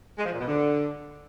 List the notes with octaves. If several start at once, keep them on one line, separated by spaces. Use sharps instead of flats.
G#3
F3
A#2
B2
D3